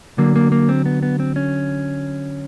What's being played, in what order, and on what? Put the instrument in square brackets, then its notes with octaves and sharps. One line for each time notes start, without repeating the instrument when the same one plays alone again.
[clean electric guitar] D3 F#3 A#3
A#3
A#3
C4
B3
B3
C4
C#4